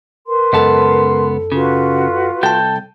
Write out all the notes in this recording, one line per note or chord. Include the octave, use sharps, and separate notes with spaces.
A#4 B4 C6
C#2 F#2 B3 A4 A5
C#3 F4 F#4 B4
C2 A4 G5 A5 G6